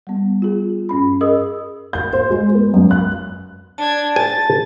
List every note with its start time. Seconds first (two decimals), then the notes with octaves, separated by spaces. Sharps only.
0.07 G3 B3
0.42 F4 G#4
0.89 G2 C#4 B5
1.21 G#4 A#4 D#5 D#6 E6
1.93 G6
2.13 C5
2.30 G#3
2.55 B3
2.74 F#2
2.91 F#6
3.78 D4 A5 G#6
4.16 G#5 A6